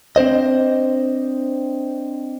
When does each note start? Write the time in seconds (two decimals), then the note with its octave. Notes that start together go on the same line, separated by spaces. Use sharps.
0.16 C4 D4 C5 D#5